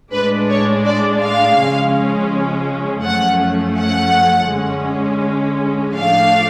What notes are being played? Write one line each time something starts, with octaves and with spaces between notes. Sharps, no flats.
A2 G#3 D4 B4
C#5
D5
F5
C#3 F3 G#3 C#4
F#2 F3 A3 C#4 F#5
F#5
D3 G#3 C#4
A2 F3 A3 D4 F5